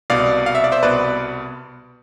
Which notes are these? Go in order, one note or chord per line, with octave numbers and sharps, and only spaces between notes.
C2 B2 B3 D5 F5
F5
E5
D5
C5 E5
C2 B2 B3 B4 D5